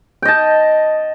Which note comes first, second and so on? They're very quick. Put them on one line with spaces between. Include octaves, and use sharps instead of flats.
G5 D#5 A5